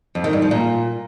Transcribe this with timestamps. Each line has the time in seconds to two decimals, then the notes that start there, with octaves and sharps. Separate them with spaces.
0.15 F2
0.24 D#3
0.33 G2
0.42 F3
0.51 A#2